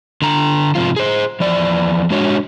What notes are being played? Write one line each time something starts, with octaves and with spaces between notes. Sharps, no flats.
D3 A#5
G#2 C3 F3 F4
G#4 C5
E2 F3 D5
G#3 D4 F#4 C#5